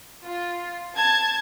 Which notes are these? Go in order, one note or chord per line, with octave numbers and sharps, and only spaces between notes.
F4
A5 G#6